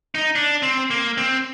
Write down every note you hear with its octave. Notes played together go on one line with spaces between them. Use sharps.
D#4
D4
C4
A#3
C4